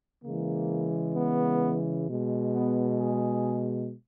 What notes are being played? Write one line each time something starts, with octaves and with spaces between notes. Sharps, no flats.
C#3 E3 G#3 A#3
B3
B2 G#3
B3
G#4